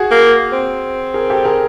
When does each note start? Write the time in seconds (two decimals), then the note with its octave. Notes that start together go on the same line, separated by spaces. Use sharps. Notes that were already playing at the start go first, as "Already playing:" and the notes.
Already playing: F#4 G#4
0.11 A#3
0.52 C4
1.14 G#4 A#4
1.30 G4 A4
1.45 G#4 A#4